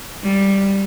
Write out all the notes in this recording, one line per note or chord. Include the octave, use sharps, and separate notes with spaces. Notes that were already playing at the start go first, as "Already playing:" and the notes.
G3